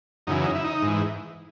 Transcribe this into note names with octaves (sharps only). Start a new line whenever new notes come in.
F#2 C#3 E3 D#4
D#4
E4
D#4
G#2 E3